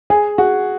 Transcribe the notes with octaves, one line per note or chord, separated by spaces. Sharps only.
G#4 G#5
F#4 G#4